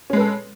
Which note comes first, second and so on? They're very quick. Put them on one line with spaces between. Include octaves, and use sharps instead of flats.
C#4 G#3 B4 A4